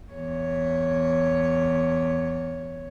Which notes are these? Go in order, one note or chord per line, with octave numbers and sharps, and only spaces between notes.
E2 C#5